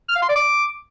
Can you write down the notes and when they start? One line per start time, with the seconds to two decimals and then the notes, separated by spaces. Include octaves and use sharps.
0.09 F6
0.16 F5
0.22 C6
0.29 D5
0.36 D6